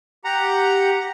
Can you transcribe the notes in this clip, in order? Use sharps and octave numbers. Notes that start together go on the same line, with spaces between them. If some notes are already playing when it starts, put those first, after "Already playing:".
G4 F#5 A#5